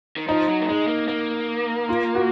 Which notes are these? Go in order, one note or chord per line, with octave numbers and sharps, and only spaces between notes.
D#3
F3 D#4
F#3
A#3
G#3 D#4
A#3
A#3
F4
F#4